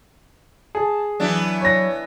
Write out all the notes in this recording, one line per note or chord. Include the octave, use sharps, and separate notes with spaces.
G#4 A5
E3 F#3 B3 D4
C#5 A#6